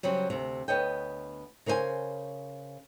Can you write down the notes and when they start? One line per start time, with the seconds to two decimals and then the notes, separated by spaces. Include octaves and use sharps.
0.03 C#3 F#3 G3 C4
0.30 D2 C3
0.68 D2 B3 C#5 D#5 G5
1.66 C#3 A#4 C5 D5 G#5